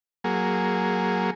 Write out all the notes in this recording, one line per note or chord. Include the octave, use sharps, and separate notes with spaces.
F#3 A#3 G#4